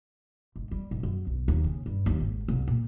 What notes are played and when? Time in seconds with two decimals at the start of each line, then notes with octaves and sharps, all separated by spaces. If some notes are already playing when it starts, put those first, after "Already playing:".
0.56 G#1
0.71 G3
0.91 G#2
1.03 F#2
1.27 B1
1.48 D#2
1.64 C#3
1.86 G2
2.06 D#2
2.20 G#1
2.48 C2
2.68 A#2